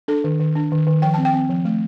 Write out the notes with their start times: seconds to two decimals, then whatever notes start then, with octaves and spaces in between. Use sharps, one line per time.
0.08 D4 A4
0.24 D#3
0.40 D#3
0.55 D4
0.72 D#3
0.87 D#3
1.02 F3 G5
1.14 C4 A5
1.25 G5
1.34 C4
1.50 F3
1.65 A3